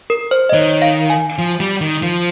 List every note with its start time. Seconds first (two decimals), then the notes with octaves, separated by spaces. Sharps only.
0.10 A#4
0.31 C5
0.49 D#5
0.53 D#3 C#5
0.82 F5
1.10 G#5
1.38 F3
1.60 G3
1.81 D#3
2.02 F3